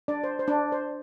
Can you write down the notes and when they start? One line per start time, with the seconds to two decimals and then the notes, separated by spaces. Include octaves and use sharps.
0.08 D4 D5
0.24 C5
0.39 C5
0.48 D4 D5
0.72 C5